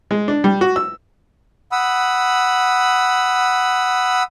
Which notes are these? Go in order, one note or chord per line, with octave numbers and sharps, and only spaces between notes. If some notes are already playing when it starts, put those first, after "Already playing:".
G#3
D4
G3
F#4
E6
F#5 B5 D#6 E6